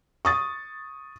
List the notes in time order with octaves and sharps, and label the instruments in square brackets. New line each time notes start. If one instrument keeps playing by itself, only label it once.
[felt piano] C#6 D#6 A6